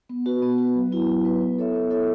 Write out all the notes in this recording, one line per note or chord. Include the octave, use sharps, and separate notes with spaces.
B3
F#4 B4
B3
F#4 B4
F#3
B3 E4 B4
F#3
B3 E4 B4
B3
E4 A4 C#5 E5
B3
E4 A4 C#5 E5